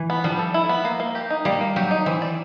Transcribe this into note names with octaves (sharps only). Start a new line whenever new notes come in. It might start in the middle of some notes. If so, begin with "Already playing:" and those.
Already playing: E3
B3
F3 G3
A4
E4
B3
A#3
A#3
G4
D#4
G3 A#3
A#3
F#3 G4
D#4
E3 C4
D5